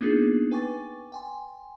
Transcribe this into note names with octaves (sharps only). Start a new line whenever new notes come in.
A#3 B3 D4 D#4 F4 G#4
B4 G5 G#5 C#6 D6 A6
G5 G#5 C6